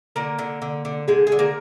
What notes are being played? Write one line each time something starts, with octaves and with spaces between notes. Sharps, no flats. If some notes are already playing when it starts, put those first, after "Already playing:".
D3 A#3 A#4
D3
D3
D3
D3 G#3 G#4
G#4
D3
A#3 A#4